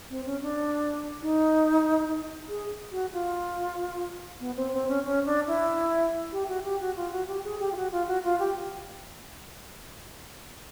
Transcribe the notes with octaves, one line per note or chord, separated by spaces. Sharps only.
C4
C#4
D4
D#4
G#4
F#4
F4
B3
C4
C4
C#4
C#4
D4
E4
G4
F#4
G4
F#4
F4
F#4
G4
G#4
G4
F4
F#4
F4
F#4
F4
G4